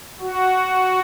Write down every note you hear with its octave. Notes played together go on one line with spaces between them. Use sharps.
F#4